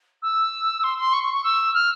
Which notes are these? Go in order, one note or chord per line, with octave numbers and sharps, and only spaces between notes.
E6
C6
C6
C#6
C#6
C#6
E6
F6